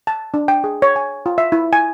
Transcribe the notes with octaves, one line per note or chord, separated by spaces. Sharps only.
A5
D4
G5
G#4
C#5
G#5
F4
E5
E4
G#5